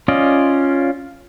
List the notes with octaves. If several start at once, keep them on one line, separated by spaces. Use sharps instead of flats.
C#4 F4 D5 D#5